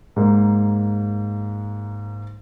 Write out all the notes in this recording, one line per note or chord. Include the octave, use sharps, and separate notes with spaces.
G#2 A#3